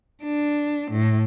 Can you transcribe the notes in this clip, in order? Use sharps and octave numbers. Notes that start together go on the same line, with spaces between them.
D4
A2